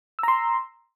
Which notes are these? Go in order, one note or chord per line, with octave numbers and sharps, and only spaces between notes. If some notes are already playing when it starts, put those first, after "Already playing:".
A#5 C6 E6